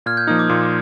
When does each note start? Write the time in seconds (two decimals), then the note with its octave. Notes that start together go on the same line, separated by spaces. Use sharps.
0.06 A#2 F6 G#6
0.17 G6
0.27 F3 A#3 D#4 D#6
0.39 D6
0.49 A#2 C6